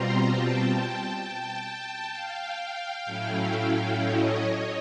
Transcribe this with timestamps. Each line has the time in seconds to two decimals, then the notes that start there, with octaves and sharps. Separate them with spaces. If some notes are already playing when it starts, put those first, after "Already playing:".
Already playing: B2 G3 C4 F4 A#5 C6
0.23 G5 A5
1.17 G5 A5
2.12 F5 G5
3.05 A2 F#3 A3 C#4 E4
3.99 C#5 D#5